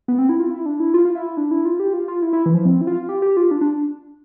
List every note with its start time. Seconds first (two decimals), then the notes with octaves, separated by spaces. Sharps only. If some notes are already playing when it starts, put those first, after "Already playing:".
0.08 B3
0.18 C4
0.29 E4
0.40 F4
0.51 E4
0.66 D4
0.80 E4
0.94 F4
1.05 F4
1.15 E4
1.37 D4
1.51 E4
1.65 F4
1.80 G4
1.93 F4
2.08 F4
2.22 E4
2.33 E4
2.46 E3
2.54 F3
2.65 C4
2.81 E4
2.87 F4
3.09 G4
3.22 G4
3.37 F4
3.51 D4
3.61 D4